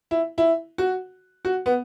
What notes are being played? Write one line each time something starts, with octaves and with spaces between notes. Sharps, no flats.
E4
E4
F#4
F#4
B3